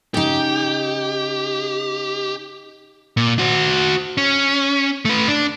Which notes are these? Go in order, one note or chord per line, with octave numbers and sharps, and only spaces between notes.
C#3 D#4 G4
A#2
F#4 C5
C#4
A3 B4
D4